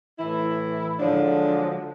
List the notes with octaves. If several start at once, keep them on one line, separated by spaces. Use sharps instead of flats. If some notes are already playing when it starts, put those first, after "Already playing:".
A2 E3 E4
D3 F3 F#3 G#3 D4